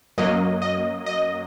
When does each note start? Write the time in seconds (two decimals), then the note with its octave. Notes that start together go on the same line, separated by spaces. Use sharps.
0.18 F#2 F#3 A#3 D#5
0.62 D#5
1.06 D#5